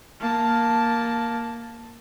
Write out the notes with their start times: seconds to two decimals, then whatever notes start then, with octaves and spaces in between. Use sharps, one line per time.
0.20 A#3 A5